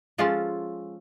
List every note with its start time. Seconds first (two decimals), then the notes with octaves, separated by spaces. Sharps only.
0.18 F3 G#3 C#4 F4 A4